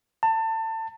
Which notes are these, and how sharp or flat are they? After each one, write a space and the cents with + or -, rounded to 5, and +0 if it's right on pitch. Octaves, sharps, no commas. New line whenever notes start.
A5 +25